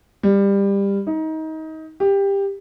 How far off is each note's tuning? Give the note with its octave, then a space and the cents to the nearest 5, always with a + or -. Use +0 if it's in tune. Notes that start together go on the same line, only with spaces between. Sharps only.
G3 +20
D#4 +25
G4 +15